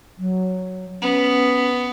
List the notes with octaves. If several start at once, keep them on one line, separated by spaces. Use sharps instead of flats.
F#3
B3 C#4